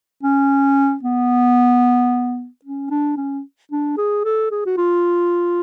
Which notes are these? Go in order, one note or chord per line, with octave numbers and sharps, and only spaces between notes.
C#4
B3
C#4
D4
C#4
D4
G#4
A4
G#4
F#4
F4